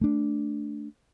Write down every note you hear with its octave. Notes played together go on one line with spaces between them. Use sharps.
A3 D4